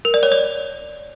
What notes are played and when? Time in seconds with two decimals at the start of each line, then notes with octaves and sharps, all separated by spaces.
0.05 A#4
0.14 D5
0.23 C#5
0.32 D5